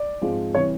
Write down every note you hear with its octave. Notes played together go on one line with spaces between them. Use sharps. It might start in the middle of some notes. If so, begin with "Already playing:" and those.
Already playing: D5
G#2 F3 G#3 C4
C3 E3 G3 C#5